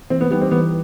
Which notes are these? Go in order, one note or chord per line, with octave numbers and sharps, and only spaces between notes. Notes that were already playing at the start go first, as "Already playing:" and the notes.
E3 C4
B3
G3 B3 D#4 G4
C4
E3 B3